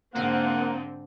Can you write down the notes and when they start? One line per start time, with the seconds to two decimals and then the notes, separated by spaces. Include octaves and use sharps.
0.15 G#2 D3 A#3 C4 F#5